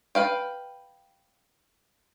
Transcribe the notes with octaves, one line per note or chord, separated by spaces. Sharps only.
B4 F5 G5